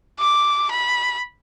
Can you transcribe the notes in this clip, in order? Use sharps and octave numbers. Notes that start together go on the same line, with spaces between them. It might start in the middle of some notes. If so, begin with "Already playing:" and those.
D6
B5